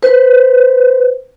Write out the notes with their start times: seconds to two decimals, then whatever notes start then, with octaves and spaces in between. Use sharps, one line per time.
0.03 B4 C5